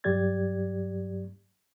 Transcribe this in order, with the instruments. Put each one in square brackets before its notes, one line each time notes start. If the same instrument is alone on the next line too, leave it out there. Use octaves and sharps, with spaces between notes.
[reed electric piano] G2 F#3 G4 D5 G#6 A6